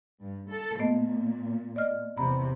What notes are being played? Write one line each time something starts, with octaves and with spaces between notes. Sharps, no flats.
G2
A4
A#2 A3 B3 D#5
D5 D#5 F6
E2 C3 A#5 B5